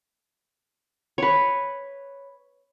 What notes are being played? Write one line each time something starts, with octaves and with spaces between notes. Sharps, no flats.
B4 C#5